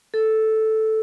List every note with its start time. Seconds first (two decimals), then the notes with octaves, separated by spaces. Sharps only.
0.14 A4